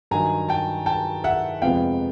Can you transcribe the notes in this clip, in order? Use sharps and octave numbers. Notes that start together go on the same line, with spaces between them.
G2 D#3 F#3 G#5 A#5
G5 A5
G5 A5
E5 F#5
F2 C3 F3 G#3 B3 F5 G5